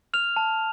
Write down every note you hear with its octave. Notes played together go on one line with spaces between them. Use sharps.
F6 F7
A5